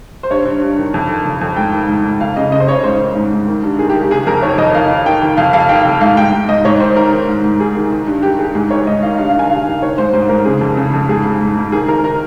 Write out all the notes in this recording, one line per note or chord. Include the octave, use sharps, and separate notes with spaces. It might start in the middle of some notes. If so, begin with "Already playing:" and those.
C5
G2 C#5
G2
G2
D#3
F2
D#3
F2
F2
G#2 G5
D#3
G#2
G#2
F2 F5
C#3 D#5
C#3 D#5
C5
C#3 C#5
G#2 C5
D#3
G#2
G#2
D#3
G2
D#3 G#4
G4
D#3
G4
C3 G#4
F2 A#4
D#3 C#5
F2 D#5
D#3 F5
D#3
D#3 G5
D#3
F2 F5
F2 F5
D#3 G5
F2
G#2 F5
G#2 G5
G#2
G#2 D#5
G#2 C#5
D#3 C5
D#3 A#4
D#3
G#2
G#2
D#3 G#4
D#3
D#3
G2
D#3 G4
D#3 G#4
G#2 G#4
D#3 C#5
G#2 D#5
D#3 F5
G2 F5
F5
D#3
G#5
G2 F5
D#3
D#3 C#5
G#2 C5
G#2 C5
G#2 A#4
C#3 G#4
F2
C#3
F2
G#2 G#4
G#2
G#2
G#2
D#3 G#4
D#3 A#4
D#3 A#4